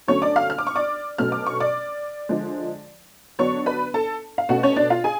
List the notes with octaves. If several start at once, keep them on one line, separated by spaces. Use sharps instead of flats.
D3 F#3 A3 C#4 C#5 C#6
D5 D6
F5 F6
F6
D6
C#6
D5 D6
B2 F#3 A3 C#4 F6
D6
C#6
D5 D6
D3 F3 G#3
D3 F#3 B3 D4 C#5 C#6
B4 B5
A4 A5
F5
B2 A3 C#4 F#4 F#5
C#4 C#5
D4 D5
F4 F5
G#4 G#5